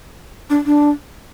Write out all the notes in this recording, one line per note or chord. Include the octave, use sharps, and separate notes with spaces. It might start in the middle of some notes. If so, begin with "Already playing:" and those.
D4
D4